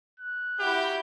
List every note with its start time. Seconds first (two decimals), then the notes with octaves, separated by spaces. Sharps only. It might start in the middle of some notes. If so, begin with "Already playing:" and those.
0.20 F#6
0.59 E4 F#4 G4 G6